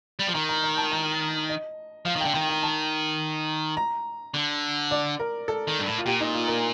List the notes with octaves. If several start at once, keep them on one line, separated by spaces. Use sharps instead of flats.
G3
F3
D#3 A#5
A#5
A#5
A5
A#5
D#5
F3 F5
D#3
G5
D3
D#3 G5
G5
A5
A#5
D3
D5
A#4
A4
D#3
G2
A2
F4
A#2 G4
D#4
F4
A#4